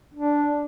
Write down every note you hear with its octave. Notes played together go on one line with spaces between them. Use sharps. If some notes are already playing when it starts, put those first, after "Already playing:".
D4